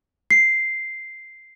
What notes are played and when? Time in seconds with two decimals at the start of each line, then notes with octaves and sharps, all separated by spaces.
0.31 C7